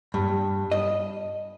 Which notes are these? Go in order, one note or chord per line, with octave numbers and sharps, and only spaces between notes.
G2
D#5